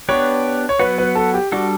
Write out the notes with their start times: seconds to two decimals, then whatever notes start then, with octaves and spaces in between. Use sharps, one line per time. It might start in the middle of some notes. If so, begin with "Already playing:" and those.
0.09 B3 D4 G4 B4 C#5
0.69 C#5
0.79 F#3 B3 F#4 B4
0.98 B4
1.15 A4
1.34 G4
1.52 G3 D4 F#4 A4